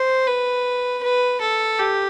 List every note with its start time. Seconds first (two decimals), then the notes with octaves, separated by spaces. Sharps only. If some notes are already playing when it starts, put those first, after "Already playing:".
Already playing: C5
0.27 B4
1.03 B4
1.41 A4
1.79 G4